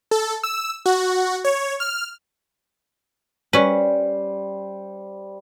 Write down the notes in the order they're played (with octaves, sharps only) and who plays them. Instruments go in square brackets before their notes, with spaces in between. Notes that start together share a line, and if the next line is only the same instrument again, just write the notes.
[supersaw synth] A4
E6
F#4
C#5
F6
[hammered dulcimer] G3 C5 [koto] C#4 B4